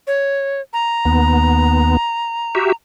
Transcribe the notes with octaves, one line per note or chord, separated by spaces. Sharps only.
C#5
A#5
D#2 B3
F#4 G4 E5